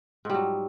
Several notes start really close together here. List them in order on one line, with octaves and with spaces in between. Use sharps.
G#2 G3 F#3